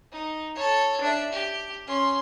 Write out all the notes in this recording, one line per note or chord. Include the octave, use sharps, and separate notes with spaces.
D#4
A4 C#5
D4 E5
G4
C#4 C6